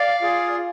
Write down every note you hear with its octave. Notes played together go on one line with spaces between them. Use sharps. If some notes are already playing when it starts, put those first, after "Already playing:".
Already playing: D5 F5
F4 G#4